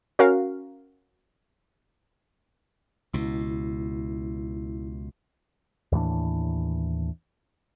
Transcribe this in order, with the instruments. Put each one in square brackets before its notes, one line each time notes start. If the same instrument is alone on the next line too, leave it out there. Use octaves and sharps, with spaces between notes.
[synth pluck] C#4 F#4 A#4 F5
[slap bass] C#2 B2 [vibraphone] E4
[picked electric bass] D#2 A2 E3 D4